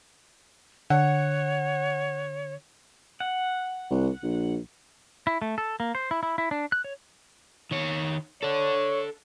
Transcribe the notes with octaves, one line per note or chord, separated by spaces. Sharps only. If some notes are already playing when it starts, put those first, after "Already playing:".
D3 C#5 F#5
F#5
C2
A#1
E4
A3
A4
A#3
C5
E4
E4
E4
D4
F#6
C#5
D#3 C#5
A4 C#5 D5